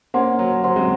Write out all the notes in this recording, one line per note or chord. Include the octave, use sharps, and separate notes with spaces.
A#3 C#4 C5 F#5 C6
F#3
F#3 C5 F#5 C6
G#3 C4